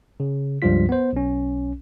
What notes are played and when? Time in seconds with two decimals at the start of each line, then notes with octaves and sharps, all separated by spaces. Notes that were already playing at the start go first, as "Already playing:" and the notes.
0.20 C#3
0.62 C#2 G2 F3 G3 F4 B6
0.89 B3 C5
1.13 B1 C#4